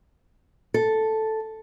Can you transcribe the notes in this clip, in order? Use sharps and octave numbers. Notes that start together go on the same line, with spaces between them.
A4